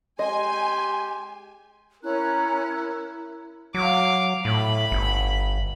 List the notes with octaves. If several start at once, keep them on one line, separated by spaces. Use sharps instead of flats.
G#3 G4 D#5 G#5 C6
C#4 E4 A#4 A#5 F#6
F#3 F5 D6
A2 B5
G1